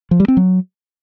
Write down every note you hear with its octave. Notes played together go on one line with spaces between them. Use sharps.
F3
G3
C4
F#3